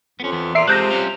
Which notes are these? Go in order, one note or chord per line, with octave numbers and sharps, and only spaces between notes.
F2 B3 C#4
E2 B3
A#2 E5 C7 D7
C3 G#3 F4 A4 F#6 G6 A#6
G3 C#4 F4